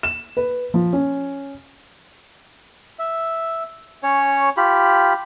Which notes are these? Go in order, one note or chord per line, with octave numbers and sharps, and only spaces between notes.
E7
B4
F3
C#4
E5
C#4 C#5
F4 G4 B5